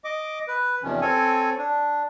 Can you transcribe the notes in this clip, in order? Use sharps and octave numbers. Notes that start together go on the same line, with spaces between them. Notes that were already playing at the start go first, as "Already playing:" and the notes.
D#5 D6
B4
E2 C3 D#3 F3 C#4
C4 A4 C#5 G#5
D4